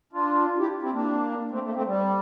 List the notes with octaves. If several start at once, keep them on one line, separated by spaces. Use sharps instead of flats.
D4 F4
E4 G4
C4 E4
A#3 D4
A3 C4
A3
A#3
A3 C4
G3